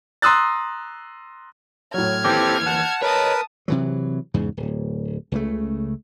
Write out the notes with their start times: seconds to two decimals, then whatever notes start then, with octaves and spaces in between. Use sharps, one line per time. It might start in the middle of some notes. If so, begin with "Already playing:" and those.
0.22 A#5 C6 D#6 E6 F#6 A6
1.94 A2 F#3 F6 G#6
2.24 D#2 E3 C4 G4 A4 D6 G6 A#6
2.66 F#5 A5 F#6
3.02 A#4 B4 C#5 D#5 A5 D#6
3.68 C3 E3 F#3
4.34 E2 G#2 C#3
4.57 D1
5.32 C#2 C#3 A3